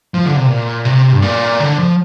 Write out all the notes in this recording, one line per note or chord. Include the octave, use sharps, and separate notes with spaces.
F3
D3
C3
A#2
C3
G2
A#2
D3
F3